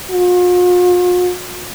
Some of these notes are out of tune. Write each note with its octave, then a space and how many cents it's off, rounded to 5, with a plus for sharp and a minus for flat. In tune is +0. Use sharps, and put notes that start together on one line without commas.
F4 +45